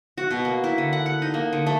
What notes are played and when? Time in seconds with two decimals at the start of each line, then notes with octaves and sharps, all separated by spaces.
0.18 F#4
0.31 B2
0.45 A#3
0.64 E4
0.78 D3
0.93 F#5
1.06 F#5
1.22 D#4
1.34 A#3
1.53 D3
1.67 A3